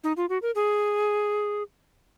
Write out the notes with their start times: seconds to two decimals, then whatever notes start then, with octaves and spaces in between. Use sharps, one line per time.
0.04 D#4
0.17 F4
0.29 F#4
0.42 A#4
0.55 G#4